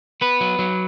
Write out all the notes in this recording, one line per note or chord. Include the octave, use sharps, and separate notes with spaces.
B3 B4
F#3
F#3